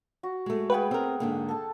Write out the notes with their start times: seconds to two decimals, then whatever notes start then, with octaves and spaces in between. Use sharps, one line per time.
0.23 F#4
0.46 G#3 A3
0.70 G#4 B4 F#5 G5
0.91 C4 A#4
1.20 G#2 D3 A#3
1.48 A4 A5